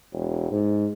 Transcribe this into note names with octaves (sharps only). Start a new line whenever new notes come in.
E1
G#2